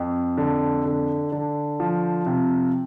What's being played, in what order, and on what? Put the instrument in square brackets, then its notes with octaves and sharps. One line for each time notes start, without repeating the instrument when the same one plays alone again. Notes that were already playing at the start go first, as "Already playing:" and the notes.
Already playing: [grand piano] F2
D3
D3
D3
F3
C3